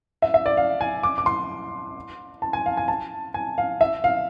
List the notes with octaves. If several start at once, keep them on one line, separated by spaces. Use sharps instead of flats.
E5
E5
D5
F5
G#5
D6
D6
C6
A5
G#5
F5
G#5
A5
G#5
F5
E5
F5